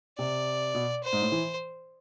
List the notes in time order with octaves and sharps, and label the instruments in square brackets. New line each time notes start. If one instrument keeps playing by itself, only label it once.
[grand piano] C3 [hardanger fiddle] D5
[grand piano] B2
[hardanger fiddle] C5
[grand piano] G#2
A2
E3